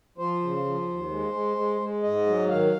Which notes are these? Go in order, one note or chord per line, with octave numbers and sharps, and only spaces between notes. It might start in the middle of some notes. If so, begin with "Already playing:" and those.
F3 C5
C#3
F3
D#2
G#3
G#3
G#3
G#3
G#2 D#5
F#3
D#3 F5